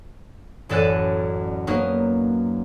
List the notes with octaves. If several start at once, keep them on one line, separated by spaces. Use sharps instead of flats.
A1 F#2 A4 D5 F#6 D#7
F#3 A#3 B3 D#4 A#4